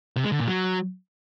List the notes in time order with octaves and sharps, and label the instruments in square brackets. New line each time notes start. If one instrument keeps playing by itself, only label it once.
[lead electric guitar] C3
G#3
D3
A#2
F#3